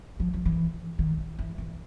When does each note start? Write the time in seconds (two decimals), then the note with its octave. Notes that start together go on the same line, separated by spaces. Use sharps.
0.20 F3
0.34 F3
0.45 E3
0.99 D#3
1.18 E3
1.39 E3
1.58 E3